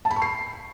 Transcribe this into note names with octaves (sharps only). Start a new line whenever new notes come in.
A5
B5
C#6
C7